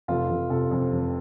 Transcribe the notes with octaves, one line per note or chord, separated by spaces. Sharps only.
F1 F4 A4
F1
C3 F4 A4
F2
F1